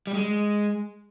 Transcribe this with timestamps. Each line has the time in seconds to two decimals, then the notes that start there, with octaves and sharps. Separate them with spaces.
0.07 G3
0.15 G#3